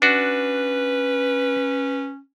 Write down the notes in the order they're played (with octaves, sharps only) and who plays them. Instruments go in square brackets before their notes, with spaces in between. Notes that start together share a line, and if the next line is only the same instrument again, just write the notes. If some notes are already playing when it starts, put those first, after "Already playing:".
[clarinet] C#4 [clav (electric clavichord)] D4 F#4 [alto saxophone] B4